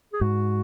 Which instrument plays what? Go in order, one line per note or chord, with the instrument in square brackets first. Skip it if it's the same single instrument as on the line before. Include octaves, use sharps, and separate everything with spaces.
[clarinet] G#4
[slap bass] G#2 [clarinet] F#4